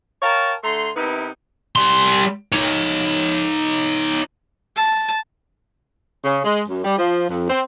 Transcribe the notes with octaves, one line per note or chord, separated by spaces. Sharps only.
A#4 C#5 F5 G5 A5 A#5
D3 A3 A#5 C6
C3 B3 D#4 E4 A#4 B4
G3 C6
D#4 C#5
A5
C#3
G#3
F#2
G3
F3
F2
C4